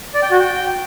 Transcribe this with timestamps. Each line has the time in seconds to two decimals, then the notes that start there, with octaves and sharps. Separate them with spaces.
0.14 D5
0.23 G5
0.31 F#4
0.39 G5